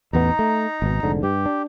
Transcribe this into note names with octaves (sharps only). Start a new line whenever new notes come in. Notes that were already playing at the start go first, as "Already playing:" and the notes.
A1 E2 B3 D#4 A#5
A3
G#1 B2
F1 G#2 D3
G2 G4
D4